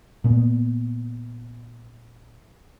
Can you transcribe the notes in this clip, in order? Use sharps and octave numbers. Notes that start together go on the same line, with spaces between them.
A#2 B3